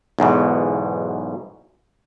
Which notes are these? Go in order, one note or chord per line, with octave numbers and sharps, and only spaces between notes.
B1 E2 G#2 B2